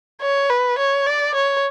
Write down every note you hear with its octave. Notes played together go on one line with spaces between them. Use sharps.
C#5
B4
C#5
D5
C#5